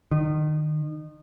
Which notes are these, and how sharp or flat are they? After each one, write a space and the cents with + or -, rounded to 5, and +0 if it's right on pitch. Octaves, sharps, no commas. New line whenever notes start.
D#3 -30